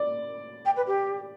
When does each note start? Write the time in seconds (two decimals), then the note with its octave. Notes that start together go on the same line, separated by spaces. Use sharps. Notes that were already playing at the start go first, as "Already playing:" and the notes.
Already playing: D5
0.65 G5
0.77 B4
0.87 G4